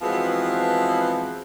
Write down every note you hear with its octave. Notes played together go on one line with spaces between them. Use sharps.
E3 F3 G#3 B3 C4 F#4